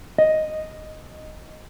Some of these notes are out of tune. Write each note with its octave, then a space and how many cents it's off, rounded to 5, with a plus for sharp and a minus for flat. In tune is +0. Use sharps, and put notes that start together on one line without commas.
D#5 +0